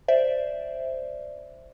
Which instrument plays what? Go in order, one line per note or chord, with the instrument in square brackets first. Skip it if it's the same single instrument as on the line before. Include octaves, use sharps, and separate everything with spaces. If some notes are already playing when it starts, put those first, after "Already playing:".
[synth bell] C5 D5 E5